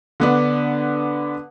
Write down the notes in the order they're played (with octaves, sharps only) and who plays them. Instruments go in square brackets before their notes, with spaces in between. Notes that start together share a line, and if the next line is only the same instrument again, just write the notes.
[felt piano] D3 B3 D4